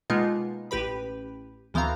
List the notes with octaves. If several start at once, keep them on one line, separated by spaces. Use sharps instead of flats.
B2 G#3 A#3 B3 D#4 F4
A1 G4 B4 B5
D2 E3 B3 C4 F5 A#5